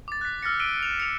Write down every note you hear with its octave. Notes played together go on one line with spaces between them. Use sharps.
D6 A6
F#6 B6
E6 F6 A6 A#6 C#7
E6 B6 D7 D#7 G7
E7 F7
C#7 F7